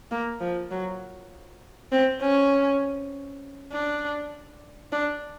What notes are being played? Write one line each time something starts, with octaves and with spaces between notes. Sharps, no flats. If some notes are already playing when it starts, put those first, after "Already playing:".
A#3
F3
F#3
C4
C#4
D4
D4